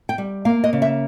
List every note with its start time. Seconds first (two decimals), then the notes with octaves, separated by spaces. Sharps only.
0.09 G5
0.18 G3
0.45 A#3 F5
0.64 D#5
0.73 C#3
0.82 E5